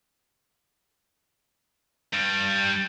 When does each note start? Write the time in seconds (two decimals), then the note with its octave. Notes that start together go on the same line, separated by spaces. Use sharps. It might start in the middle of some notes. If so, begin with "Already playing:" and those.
2.13 G2 G3